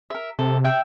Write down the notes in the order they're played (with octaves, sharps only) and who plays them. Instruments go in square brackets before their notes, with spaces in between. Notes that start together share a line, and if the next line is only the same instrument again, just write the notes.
[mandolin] A#4 E5
[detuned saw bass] C3 [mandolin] A4
[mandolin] E5 G5